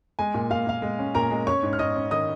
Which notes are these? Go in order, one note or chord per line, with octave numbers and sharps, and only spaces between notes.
G#3 G#5
A#2
A#2 F5
A#2 F5
G#3
C#4
A#2 A#4 A#5
G#3
C#4 C#5 C#6
G#2
F6
G#2 D#5 D#6
C#4
D#3 D#5 D#6